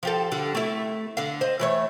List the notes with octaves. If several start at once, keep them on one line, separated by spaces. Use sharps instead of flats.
F3 G4 A4
D3 G3
A3 E4
D3 F5
C5 D#5
E3 A3 C#5